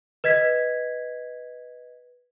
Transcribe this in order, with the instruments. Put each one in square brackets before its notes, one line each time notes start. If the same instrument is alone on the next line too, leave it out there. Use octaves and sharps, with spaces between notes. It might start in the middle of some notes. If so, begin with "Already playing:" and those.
[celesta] B4 D#5 G#6 B6